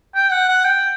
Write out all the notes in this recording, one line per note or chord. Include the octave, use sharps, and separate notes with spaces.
G5
F#5
F#5
G5